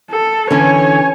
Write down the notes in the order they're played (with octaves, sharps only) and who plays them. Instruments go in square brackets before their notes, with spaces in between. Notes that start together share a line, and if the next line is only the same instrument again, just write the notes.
[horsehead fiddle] A4
[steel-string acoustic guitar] D3 E3 C#4 [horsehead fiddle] C#5 G#5